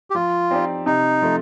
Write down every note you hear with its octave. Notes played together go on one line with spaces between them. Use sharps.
G4
F3 F4
C4 D#4 G4 D5
C3 D#4
F3 A3